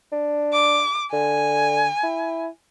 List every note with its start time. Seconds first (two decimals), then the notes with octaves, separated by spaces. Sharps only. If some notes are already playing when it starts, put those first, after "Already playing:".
0.12 D4
0.53 D6
1.13 D3 G#5
2.03 E4